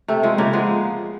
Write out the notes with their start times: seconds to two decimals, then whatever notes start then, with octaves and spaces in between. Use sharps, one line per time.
0.08 C3 A3
0.23 F3 G#3
0.38 C#3 A#3
0.53 F3 G#3 B3